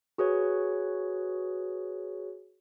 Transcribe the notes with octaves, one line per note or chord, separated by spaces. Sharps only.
F#4 G#4 B4 C#5